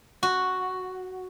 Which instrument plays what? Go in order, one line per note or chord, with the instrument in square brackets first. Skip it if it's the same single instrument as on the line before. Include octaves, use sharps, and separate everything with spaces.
[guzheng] F#4